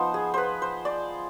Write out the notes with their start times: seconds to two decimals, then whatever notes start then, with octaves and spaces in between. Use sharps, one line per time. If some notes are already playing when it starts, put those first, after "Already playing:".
Already playing: F3 B3 D#4 C5
0.14 G#4
0.34 B4 C5
0.62 C5
0.85 D5